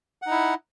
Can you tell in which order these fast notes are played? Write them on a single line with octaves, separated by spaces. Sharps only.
F#5 D#4 E4